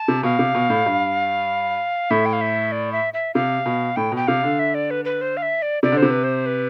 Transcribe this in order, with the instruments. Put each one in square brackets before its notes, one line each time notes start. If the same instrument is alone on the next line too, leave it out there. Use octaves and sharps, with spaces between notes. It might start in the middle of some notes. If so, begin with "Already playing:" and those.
Already playing: [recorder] A5
[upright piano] C3
[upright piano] B2 [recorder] F5
[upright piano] C3
B2
A2
G2
[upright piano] A2 [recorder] E5
[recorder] G5
F5
E5
D5
E5
E5
[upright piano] C3 [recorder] F5
[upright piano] B2
[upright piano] A2 [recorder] G5
[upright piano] B2
[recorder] G5
[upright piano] C3 [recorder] F5
[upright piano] D3
[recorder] E5
D5
B4
B4
C5
F5
E5
D5
[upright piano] C3 [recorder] D5
[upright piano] D3
[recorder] C5
[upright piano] C3
[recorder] B4
C5
B4